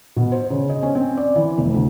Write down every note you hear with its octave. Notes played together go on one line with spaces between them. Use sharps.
B2
C5
C#3
D#5
C#4
C4
D5
E3
F1
D2